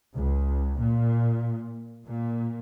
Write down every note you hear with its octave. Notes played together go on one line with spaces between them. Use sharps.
C#2
A#2
A#2